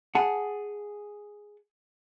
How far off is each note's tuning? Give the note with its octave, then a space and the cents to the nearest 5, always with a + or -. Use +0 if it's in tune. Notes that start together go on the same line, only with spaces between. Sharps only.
G#4 +0 F#5 +0 A5 +0